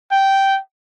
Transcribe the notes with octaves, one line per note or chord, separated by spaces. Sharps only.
G5